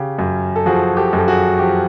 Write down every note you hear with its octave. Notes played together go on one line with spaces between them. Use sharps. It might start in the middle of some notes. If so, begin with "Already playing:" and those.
Already playing: C#3 G4
F#2
A4
F3 F#4 G#4
G4 A4
F#2 A4
F#4 G#4
F3 G4